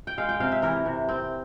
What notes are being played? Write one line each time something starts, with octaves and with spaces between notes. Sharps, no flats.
G5
G#3 F5
G5
C3 F5
E5
E3 A#4
C3
C4